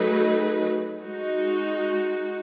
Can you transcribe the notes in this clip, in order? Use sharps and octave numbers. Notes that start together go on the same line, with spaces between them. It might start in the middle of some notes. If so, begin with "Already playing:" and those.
Already playing: F#3 A3 D#4 G#4 B4
G#3 D#4 F#4